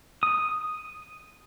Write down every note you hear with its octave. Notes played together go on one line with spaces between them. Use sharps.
D#6